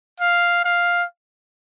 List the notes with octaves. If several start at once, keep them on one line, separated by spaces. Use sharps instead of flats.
F5
F5